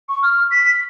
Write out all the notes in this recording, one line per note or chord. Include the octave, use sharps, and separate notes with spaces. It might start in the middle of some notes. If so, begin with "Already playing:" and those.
C#6
F6
B6